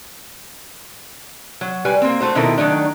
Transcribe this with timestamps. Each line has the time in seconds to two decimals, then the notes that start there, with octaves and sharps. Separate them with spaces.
1.61 F#3
1.85 G3 B4 G#5
2.02 A#3 C4
2.21 A3 F#4 C5
2.35 B2 D#3 F3 E4 A4 A#4
2.58 D#3 F#3 A3 D4